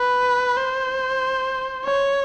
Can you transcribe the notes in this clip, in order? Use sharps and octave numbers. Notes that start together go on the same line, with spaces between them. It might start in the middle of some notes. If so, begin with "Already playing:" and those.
Already playing: B4
C5
C#5